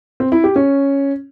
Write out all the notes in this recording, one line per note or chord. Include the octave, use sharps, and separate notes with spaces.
C4
E4
G4
C#4